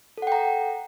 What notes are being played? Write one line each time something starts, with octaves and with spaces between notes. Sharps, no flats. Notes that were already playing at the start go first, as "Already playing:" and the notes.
A4 F#5 G5 A#5